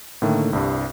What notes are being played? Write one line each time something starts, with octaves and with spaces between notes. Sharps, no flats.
A2 D3 D#3 A3 A#3
C2 G2